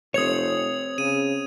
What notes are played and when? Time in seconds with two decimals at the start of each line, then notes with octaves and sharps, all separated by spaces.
0.14 F1 C4 C#5 D#6 G#6 F7
0.98 C#3 D#7